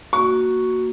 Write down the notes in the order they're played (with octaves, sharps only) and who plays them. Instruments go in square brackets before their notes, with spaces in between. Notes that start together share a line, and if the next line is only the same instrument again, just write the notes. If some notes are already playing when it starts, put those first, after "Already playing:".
[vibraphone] A#3 F#4 [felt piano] C#6